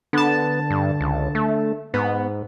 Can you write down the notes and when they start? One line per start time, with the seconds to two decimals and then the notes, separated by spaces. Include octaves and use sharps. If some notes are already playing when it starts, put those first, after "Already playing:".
0.13 D3 B3 A5
0.70 G2
1.01 C#2
1.35 A3
1.94 G#2 B3